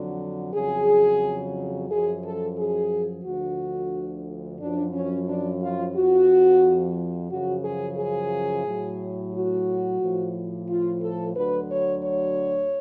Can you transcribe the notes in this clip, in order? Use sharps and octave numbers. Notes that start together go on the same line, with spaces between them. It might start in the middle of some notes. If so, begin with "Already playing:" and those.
Already playing: F2 D3 F#3
F2 C#3 F#3 G#4
F#2 F3 G#4
A4
G#4
D2 D3 F3 F#4
F#2 F3 D4
C#4
D4
F4
F2 F3 F#4
F#2 C#3 F3 F#4
G#4
G#4
A2 F#3
F#4
A2 F3
F4
A4
D2 D3 F#3 B4
C#5
C#5